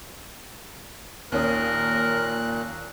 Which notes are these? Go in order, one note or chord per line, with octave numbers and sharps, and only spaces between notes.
D#2 A#2 C#4 A#4 D#6 F#6